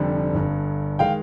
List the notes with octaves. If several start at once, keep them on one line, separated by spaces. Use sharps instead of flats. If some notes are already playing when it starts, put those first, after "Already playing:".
Already playing: F1 F2 D3 G3
G1 G2 D3
D#3 G#3 F5 G5